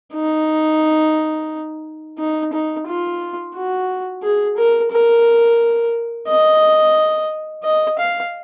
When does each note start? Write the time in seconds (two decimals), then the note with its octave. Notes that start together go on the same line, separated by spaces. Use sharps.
0.14 D#4
2.19 D#4
2.53 D#4
2.87 F4
3.55 F#4
4.23 G#4
4.57 A#4
4.91 A#4
6.28 D#5
7.64 D#5
7.99 F5